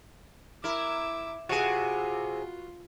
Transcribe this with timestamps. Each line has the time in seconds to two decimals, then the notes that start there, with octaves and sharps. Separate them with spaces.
0.64 E4 A#4 E5 D6
1.49 C3 F4 F#4 G#4 B4 F#5